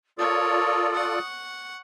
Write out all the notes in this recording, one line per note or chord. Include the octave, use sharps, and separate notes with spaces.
F4 A4 A#4 C#5 D5 D#6
F#5 C#6